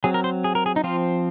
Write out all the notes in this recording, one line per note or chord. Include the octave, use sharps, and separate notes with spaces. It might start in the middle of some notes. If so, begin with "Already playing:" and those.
F#3 C4 G#4
A#4
C5
G#4
A#4
G#4
D#4
F3 C4 F4